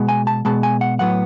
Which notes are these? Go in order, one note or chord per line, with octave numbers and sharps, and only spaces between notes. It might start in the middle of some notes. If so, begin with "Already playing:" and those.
Already playing: B2 G#3 B3
G#5
A5
B2 G#3 B3 A5
G#5
F#5
A2 F#3 B3 F#5